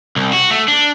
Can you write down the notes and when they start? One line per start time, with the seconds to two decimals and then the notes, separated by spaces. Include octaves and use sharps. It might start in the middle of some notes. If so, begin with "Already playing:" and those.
0.16 C2
0.33 F#4
0.51 A3
0.68 D4